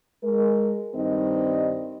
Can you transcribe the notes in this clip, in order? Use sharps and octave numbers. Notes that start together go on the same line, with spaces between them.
G#3 A#4
G2 D#3 G3 C4 D#4 D#5